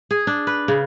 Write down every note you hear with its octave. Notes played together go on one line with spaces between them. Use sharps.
G#4
D4
B4
C#3